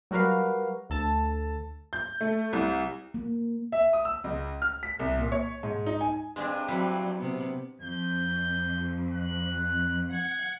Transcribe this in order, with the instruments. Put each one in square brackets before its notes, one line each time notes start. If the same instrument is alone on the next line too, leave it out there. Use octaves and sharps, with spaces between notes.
[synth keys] F#3 G3 F#4 A#4 B4 F5
D2 A4 A5
[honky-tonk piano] G6
A3
C2
[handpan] A#3
[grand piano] E5
D#6
E6
C#2
F6
B6
C2
A#2
C#5
G#2
D#4
G#5
[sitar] G2 [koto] G#3 C4 D4
[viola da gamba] F#3 C4 [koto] G3 E4 B4
[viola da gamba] C3 B3
[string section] F2 [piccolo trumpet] G6
[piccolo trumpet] F#6
[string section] F#5 [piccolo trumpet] G#6